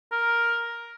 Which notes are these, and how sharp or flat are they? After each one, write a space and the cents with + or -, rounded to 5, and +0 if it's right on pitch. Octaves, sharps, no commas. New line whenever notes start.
A#4 +5